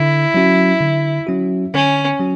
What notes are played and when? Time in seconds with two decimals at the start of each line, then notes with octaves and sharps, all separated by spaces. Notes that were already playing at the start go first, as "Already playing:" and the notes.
Already playing: D3 E4
0.34 F#3 C#4 F#4
0.81 D3
1.27 F#3 C#4 F#4
1.74 D3 C#4
2.20 F#3 C#4 F#4